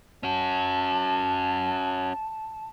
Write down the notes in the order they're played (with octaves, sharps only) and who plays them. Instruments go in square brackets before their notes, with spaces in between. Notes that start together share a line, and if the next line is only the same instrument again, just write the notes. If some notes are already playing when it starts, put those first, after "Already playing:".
[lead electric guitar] C#4 F#4 [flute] A5